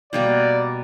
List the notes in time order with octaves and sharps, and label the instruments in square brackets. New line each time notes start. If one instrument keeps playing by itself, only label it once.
[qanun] B2 G3 A#3 [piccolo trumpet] D5